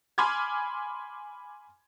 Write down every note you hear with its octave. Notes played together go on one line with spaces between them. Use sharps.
G#5 B5 C6 D6 F6 G#6